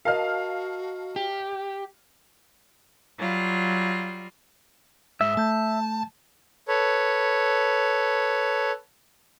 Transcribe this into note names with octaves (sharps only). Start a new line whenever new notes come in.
F#4 A#4 D#5 F5 A5 F6
G4
F#3 G3 F4
G#2 E5
A3 A5 G6
A4 B4 C#5